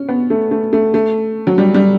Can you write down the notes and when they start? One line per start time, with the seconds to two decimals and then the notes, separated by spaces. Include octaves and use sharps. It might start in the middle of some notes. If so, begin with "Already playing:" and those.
Already playing: C#4
0.09 B3
0.30 A3
0.51 A3
0.73 A3
0.94 A3
1.47 F#3
1.58 G3
1.74 G3